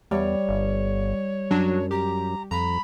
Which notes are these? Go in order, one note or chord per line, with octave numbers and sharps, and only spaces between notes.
E2 G3 C#5
G1
F#2 F#3 D4 F#4
G4 A#5
F2 A#5 B5